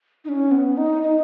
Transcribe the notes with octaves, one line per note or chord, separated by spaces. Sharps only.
D#4
C#4
B3
D#4
D#4